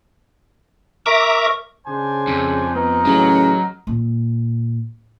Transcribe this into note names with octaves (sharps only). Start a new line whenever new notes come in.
A#4 E5 A#5 C#6 D6
C#3 D4 C5 G#5
F2
B3 D#4 A#4 D#5
A1 C#3 F#3
A#2